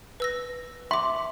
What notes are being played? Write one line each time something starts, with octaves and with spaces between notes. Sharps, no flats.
B4 E6 A#6
E5 C6 D6